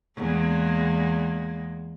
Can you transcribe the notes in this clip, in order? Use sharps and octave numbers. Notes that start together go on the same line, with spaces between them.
E2 G#3 A#3